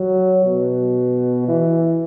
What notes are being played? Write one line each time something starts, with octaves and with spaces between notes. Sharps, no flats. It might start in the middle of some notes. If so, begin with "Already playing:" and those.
Already playing: F#3
B2
E3